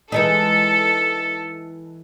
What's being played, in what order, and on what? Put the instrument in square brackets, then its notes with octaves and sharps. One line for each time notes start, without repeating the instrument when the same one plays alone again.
[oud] E3 G#3 D#4 [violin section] A4